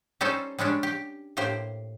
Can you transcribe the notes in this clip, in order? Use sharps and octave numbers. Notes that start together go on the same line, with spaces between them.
G3 C#4 D#4 A4 C5
G3 G#3 C#4 D4
G4
A2 A#3 G4 C5